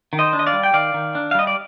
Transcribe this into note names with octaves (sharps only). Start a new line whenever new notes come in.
D#3
C5 D#5
D4
D#5
D5 F5
G3
G5
D#3 D5 F5
D#3
D4
F5
G3 D#5
D5